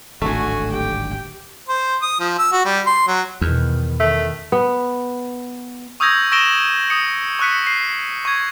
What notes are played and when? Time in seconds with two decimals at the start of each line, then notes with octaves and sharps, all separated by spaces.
0.22 D1 G#1 D3 A3 F#4 G#5
0.71 G4 G5
1.69 C5
2.02 D#6
2.20 F3
2.39 E6
2.53 F#4
2.65 G3
2.87 C6
3.08 F#3
3.41 E2 B2 D#3
4.00 D#3 A3
4.52 B3
6.00 C#6 D#6 E6 G6 G#6 A#6
6.32 C#6 E6 A#6 D7 E7 G7
6.90 D#6 C#7
7.39 C#6 E6 F#6 B6 C#7
7.67 C7
8.25 C#6 G#6